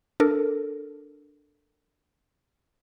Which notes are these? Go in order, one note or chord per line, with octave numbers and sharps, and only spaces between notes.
D4 A4 A#4